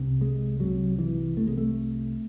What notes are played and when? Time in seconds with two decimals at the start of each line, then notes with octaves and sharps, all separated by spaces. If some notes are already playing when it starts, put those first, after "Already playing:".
Already playing: C2 C3
0.21 G#3
0.59 C2 C3 F#3
0.99 E3
1.37 C2 C3 A3
1.47 G#3
1.57 A3